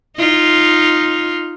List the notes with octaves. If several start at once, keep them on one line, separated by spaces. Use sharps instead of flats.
D#4 F4